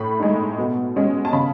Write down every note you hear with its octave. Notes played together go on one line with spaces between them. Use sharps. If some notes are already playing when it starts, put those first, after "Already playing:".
Already playing: A2 B5
G#3 D#4
B2
G#3 C#4
A5
C#3 B5